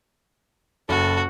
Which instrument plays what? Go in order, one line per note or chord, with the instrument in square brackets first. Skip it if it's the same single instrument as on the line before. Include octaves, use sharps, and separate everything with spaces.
[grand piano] F#1 [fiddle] F#4 [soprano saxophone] A4